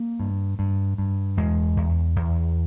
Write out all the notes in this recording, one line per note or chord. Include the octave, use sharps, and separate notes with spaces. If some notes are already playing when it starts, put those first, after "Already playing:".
Already playing: A#3
G2
G2
G2
E2 G#3
E2
E2